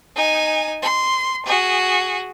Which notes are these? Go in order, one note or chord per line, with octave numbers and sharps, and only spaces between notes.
D#4 G#5
C6
F#4 G#4